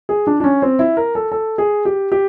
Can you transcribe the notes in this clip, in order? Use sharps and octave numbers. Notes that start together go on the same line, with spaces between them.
G#4
D4
D4
C#4
C4
E4
A#4
A4
A4
G#4
G4
G4